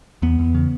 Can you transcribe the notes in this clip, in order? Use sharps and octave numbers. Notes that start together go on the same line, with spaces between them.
E2 B3
E2
C#3